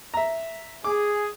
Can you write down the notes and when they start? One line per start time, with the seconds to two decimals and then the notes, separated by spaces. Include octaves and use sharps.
0.14 E5 A#5
0.84 G#4 D6